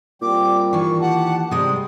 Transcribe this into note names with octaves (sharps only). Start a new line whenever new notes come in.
A#2 G3 C4 D6
D#3 E3 C#6
G4 F#5 A5
C3 G3 G#3 D#6